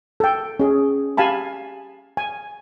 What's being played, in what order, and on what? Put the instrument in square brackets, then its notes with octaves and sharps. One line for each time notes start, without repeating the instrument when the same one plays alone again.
[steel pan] A4 G5
C#4 G#4
G4 F5 G#5 A5 B5
G#5